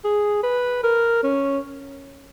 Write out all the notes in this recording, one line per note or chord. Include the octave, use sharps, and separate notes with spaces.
G#4
B4
A#4
C#4